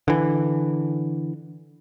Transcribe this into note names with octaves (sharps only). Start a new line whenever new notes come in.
D3 E3